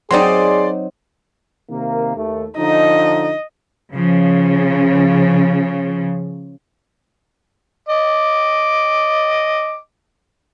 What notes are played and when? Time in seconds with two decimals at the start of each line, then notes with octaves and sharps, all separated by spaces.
0.11 F#3 C4 D#4 G#4 D5 C6
1.70 C3 D#3 A#3
2.16 D#2 A3
2.57 D3 F3 D#4 D#5
3.92 C#3 F3
7.88 D#5 D6